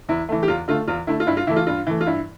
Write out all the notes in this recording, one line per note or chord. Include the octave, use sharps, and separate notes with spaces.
E2 E4
E3 A3
G4
E2 F4
D3 A3 F4
E2 F4
D3 A3 E4
F4
G2 E4
F4
E3 A3 E4
F4
G2 F4
E3 A3
F4
G2 E4